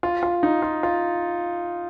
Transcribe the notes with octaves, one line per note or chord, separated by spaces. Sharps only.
F4
F4
D#4
F4
F4